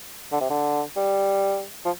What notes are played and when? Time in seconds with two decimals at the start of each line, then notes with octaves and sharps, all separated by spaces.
0.32 D3
0.41 C3
0.49 D3
0.96 G3
1.85 F3